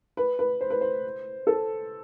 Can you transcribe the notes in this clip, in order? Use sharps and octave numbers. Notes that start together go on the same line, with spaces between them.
B4
B4
C5
B4
C5
A4